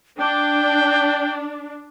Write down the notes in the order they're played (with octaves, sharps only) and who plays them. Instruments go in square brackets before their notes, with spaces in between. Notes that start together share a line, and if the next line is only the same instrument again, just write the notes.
[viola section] D4 [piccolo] G5